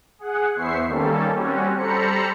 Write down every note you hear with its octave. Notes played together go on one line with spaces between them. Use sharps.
G#4 F#5
E2 B3 C5 E5 C#6 C7
D#3 G3 A#3 C#4 A4
G3 C4 C#4 F#4
G3 A4 C5 A#5 B5 C#7